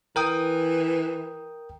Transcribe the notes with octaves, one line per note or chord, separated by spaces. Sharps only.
E3 A#4 G5 D#6